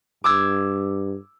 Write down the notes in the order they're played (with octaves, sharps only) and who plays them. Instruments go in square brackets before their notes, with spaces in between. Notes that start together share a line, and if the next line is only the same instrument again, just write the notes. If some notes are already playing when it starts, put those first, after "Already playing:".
[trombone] G2 [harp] D6 E6 G#6